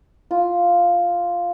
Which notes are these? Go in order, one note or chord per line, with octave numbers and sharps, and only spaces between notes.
F4